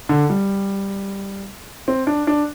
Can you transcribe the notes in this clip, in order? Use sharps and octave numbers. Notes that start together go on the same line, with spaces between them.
D3
G3
C4
D4
D4